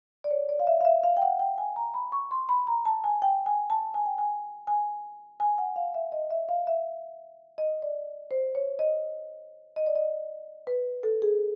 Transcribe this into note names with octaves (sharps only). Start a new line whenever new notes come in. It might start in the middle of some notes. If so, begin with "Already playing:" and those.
D5
C#5
D5
F5
E5
F5
E5
F5
G5
F#5
G5
G#5
A#5
B5
C#6
C6
B5
A#5
A5
G#5
G5
G#5
A5
G#5
G5
G#5
G#5
G#5
F#5
F5
E5
D#5
E5
F5
E5
D#5
D5
C5
C#5
D#5
D#5
D5
D#5
B4
A4
G#4